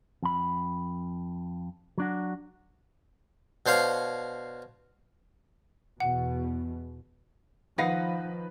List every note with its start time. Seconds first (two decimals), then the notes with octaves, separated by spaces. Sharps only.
0.23 F2 B5
1.98 F#3 D4 F#4
3.66 B2 D4 C5 C#5 F5
6.00 E2 B2 F#5
7.78 D#3 F3 D#4 B4 F5 F#5 A#6